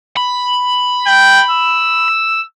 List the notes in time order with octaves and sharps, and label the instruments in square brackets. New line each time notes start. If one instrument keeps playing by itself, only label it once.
[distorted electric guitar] B5
[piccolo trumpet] G5
E6